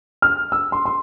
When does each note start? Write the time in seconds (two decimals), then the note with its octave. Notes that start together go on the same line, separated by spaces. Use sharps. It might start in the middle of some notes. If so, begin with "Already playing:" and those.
0.22 F6
0.52 E6
0.72 C6
0.85 C6